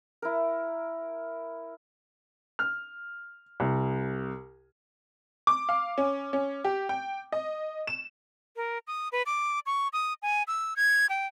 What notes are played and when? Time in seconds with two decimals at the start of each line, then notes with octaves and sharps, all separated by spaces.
0.22 E4 A#4
2.59 F6
3.60 C2
5.47 D6
5.69 F5
5.98 C#4
6.33 C#4
6.65 G4
6.89 G5
7.32 D#5
7.87 E7
8.56 A#4
8.87 D#6
9.12 B4
9.26 D6
9.66 C#6
9.93 D#6
10.22 G#5
10.48 E6
10.76 G#6
11.10 G5